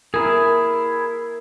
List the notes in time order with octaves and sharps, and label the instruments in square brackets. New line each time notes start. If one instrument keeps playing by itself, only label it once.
[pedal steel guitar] E4 G#4 [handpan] A#4